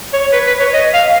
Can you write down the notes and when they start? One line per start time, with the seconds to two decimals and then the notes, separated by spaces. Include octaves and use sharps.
0.14 C#5
0.33 B4
0.47 B4
0.60 C#5
0.74 D#5
0.94 F5